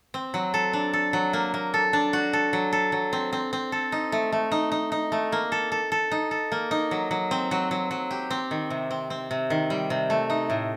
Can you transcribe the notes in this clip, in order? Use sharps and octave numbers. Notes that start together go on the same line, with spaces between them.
C4
F#3
A4
D4
A4
F#3
A#3
A#3
A4
D4
F#4
A4
F#3
A4
F#3
C4
C4
C4
A4
D#4
A3
A3
D#4
D#4
D#4
A3
A#3
A4
A4
A4
D#4
A4
A#3
D#4
F#3
F#3
C4
F#3
F#3
F#3
G4
C4
D#3
C3
C4
C4
C3
D#3
G3
C3
A3
D#4
A2